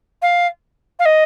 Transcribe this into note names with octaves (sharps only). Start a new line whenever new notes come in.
F5
F5
D#5